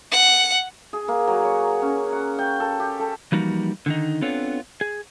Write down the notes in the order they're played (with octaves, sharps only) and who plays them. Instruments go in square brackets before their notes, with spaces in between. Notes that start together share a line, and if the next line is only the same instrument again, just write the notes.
[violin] F#5
[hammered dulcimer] G#4
A#3
F#3
C#5
C#4
F#5
G5
A4
G4
A4
[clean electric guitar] E3 F3 G3 A#3 D#4 F#4
D3 D#3 D#4
B3 C4 D4 F4 A4 C#5
G#4